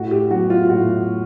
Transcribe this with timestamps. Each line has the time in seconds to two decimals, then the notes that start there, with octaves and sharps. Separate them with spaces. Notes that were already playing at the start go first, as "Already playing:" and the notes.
Already playing: A2 F#4
0.11 G4
0.31 F#3 B3 F#4
0.50 F4
0.70 A2 F#4